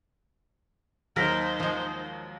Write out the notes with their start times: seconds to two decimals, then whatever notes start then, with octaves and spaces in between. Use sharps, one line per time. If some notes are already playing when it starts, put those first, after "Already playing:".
1.16 D#2 F#3 D#4 A#4 C5 B6
1.60 F3 G#3